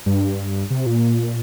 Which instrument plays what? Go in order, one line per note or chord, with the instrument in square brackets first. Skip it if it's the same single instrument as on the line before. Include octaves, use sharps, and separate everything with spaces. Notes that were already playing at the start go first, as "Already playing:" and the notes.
[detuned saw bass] G2
C3
A#2